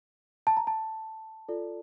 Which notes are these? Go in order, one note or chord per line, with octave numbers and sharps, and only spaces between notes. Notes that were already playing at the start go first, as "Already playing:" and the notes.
A5
A#5
A5
F4 A4 D5